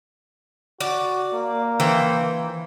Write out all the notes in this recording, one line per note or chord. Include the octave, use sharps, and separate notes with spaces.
F#4 D5
A#3
E3 C5 G5